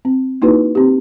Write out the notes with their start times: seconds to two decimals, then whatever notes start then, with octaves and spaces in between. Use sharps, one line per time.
0.05 C4
0.42 A#3 D#4 E4 F#4 B4
0.75 C4 G4